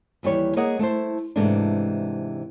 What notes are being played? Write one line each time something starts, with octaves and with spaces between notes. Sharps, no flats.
D#2 E3 G3 C#5
A#3 G#4 C#5 D#5 F#5
A3 E4 A4 C5
G#2 C3 E3 G#3 A3 D4